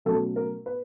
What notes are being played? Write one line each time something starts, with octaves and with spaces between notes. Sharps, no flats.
B2 F#3 A3 C#4 A4
A#4
B4